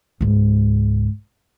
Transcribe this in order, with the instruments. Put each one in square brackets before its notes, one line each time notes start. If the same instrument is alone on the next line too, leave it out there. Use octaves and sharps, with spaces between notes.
[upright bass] C#2 G#2